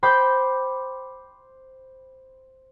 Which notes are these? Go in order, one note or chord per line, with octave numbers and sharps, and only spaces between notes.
C5 G5 B5 D6 G6